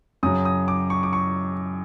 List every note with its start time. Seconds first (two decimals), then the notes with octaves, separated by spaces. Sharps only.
0.23 F#2 C#3 F#3 D#6
0.45 D#6
0.68 D6
0.90 C#6
1.03 D6
1.13 C#6